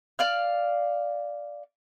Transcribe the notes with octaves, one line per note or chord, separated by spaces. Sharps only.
D5 F5 F6